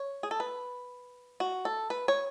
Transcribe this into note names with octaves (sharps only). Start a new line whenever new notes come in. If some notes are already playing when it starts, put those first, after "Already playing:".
Already playing: C#5
G#4
A4
B4
F#4
A4
B4
C#5